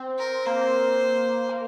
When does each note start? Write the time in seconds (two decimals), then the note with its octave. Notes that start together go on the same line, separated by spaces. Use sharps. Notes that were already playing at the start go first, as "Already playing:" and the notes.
Already playing: C4
0.18 A#4
0.46 A#3 C5
1.49 A#3